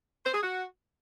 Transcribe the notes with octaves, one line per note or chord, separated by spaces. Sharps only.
C5
G#4
F#4